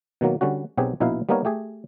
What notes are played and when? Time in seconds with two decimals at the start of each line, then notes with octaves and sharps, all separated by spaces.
0.21 B2 D#3 F#3 A#3
0.41 D3 G3 C#4 F#4
0.77 B1 B2 F#3 C4 G4 G#4
1.00 A#1 B2 D#4 E4 B4 F5
1.29 G3 A#3 B3 D#4 A#4 C#5
1.45 A3 G4 G#4